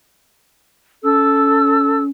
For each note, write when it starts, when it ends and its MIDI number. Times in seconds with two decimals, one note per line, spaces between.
1.04 2.10 61
1.04 2.02 69
1.04 2.02 88